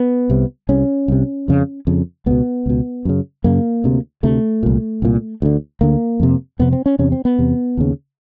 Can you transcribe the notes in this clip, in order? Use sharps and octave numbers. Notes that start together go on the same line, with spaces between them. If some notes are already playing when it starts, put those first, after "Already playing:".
Already playing: B3
C2 C3
C2 C3 C#4
C2 C3
F2 C#3
F2 C#3
C#2 B2 B3
C#2 B2
F#2 C#3
F#2 C#3 A#3
D2 C3
D2 C3 A3
C2 A#2
C2 A#2
D2 D3
D2 D3 A#3
F2 C3
F2 C3 B3
C4
C#4
E2 C3 C#4
C4
B3
E2 C3
D#2 C#3